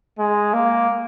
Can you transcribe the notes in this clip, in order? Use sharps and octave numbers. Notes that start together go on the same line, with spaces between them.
G#3
A#3